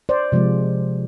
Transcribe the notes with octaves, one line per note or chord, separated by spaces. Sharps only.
C5 D5
C3 F3 G#3